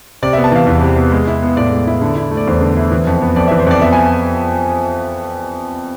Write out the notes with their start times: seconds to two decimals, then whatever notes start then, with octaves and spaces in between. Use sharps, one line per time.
0.22 C3 D5
0.33 E5
0.37 B3
0.44 A5
0.52 E3 F5
0.66 E2
0.81 C3
0.96 B3
1.12 G#3
1.27 E4
1.42 B3
1.57 A2 D5
1.72 G#3
1.87 E4
2.01 D3
2.16 E4
2.31 A3
2.37 D5
2.47 E2 C5
2.61 D3
2.77 E4
2.92 E3
3.07 F2
3.22 B3
3.36 F2 D5
3.48 E5
3.51 E3
3.60 C5
3.66 F2 D5
3.81 B3 E5
3.93 G#5